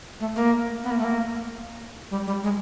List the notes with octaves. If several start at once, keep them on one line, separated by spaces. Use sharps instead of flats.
A3
A#3
B3
A#3
A3
A#3
G3
G3
G#3